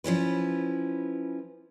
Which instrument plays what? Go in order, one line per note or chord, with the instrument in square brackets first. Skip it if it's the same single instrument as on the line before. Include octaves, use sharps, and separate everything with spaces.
[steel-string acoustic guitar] F3 C#4 E4 B4